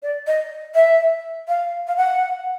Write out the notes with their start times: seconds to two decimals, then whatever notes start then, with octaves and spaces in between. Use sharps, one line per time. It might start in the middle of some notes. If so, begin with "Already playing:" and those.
0.03 D5
0.27 D#5
0.75 E5
1.48 F5
1.88 F5
1.97 F#5